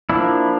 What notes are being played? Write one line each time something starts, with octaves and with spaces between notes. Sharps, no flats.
F3 A#3 D4 E4